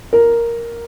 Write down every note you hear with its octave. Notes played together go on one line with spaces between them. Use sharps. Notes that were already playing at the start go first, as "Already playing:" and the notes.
A#4